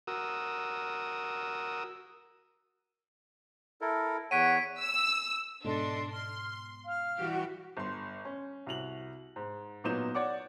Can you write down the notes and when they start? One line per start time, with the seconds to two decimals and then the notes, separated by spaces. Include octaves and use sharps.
0.07 F#4 A#4 D#6 E6
3.81 E4 A4 A#4
4.31 E2 C#5 F#5 B6 D7 D#7
4.80 E6
5.65 G#2 B2 D4 A4 D#5 C6
6.14 C6 F6
6.86 F5 F6
7.17 E3 G3 F#4 G4
7.77 G1 C6
8.25 C#4
8.67 C2 F#4 F7 F#7
9.36 G#2
9.84 A#2 F#3 B3 D#4 G6 E7
10.15 C#5 D5 F#5 D6